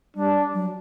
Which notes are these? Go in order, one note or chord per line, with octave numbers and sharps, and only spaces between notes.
G3 D4
F#3